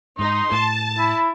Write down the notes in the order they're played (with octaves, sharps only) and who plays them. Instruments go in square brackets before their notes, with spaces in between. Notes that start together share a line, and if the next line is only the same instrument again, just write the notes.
[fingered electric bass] G#2 [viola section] D#4 [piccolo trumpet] C6
[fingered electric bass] A2 [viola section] A5
[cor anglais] E4 [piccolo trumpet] B5